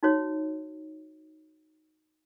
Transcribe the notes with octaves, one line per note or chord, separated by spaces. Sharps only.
D#4 F#4 C#5